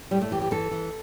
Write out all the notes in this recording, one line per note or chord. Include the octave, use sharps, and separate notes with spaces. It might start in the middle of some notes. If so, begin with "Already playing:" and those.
A2 G3
A3
E3 G4
G4
E3 A4
E3